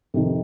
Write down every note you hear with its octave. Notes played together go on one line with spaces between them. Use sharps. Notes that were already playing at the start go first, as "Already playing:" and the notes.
F2 C3 D#3